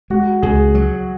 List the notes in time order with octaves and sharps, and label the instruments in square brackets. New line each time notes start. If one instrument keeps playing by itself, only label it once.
[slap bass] G#3 [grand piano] F#4
[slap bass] C#2 [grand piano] G#4
[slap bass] F#3